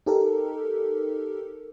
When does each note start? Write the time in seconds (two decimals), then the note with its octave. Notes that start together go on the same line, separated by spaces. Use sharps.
0.06 D#4 G4 A4 A#4